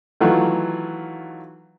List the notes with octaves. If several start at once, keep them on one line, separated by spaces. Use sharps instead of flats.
D#3 E3 F#3 A3 F4